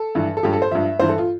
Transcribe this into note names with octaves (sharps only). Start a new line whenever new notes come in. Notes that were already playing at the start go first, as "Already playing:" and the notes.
Already playing: A4
G2 E3
A4
G2 F3 G4
A4
C5
G2 F3 E5
G2 E3 C5
A4
F4